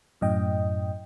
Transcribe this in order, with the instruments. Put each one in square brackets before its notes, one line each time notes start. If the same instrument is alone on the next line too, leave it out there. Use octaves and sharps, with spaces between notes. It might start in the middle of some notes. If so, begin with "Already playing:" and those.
[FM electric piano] F#2 A2 D#5 G5